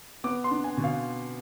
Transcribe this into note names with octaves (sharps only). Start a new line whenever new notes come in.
B3 D6
C6
D4
G#5
B2
F5